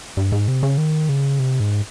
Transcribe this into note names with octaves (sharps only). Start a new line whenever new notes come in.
G2
G#2
C3
C#3
D#3
C#3
C3
G#2